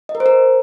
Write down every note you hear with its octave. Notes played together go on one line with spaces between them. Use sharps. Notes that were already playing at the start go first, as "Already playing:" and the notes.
D#5
A#4
C5
A#4